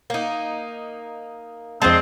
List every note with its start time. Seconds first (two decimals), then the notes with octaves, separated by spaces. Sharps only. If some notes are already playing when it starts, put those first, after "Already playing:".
0.10 A#3 D#4
1.82 F2 G#3 C4 D4 C5 D#5 A5